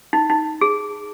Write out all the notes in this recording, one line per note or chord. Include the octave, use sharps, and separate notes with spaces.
D#4
D#4
G#4